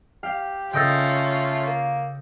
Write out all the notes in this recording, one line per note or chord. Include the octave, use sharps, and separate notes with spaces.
G4 F5
C#3 A3 C#4 F4 A4 D#5 G5
A#3